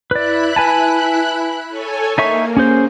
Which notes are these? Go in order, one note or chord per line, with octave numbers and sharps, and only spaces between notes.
E4 B4 D5 B5 F#6
B4 G#5 A5
A4 C#5 G#5
A#3 D#4 E5 C#6
C#4 G#4 C5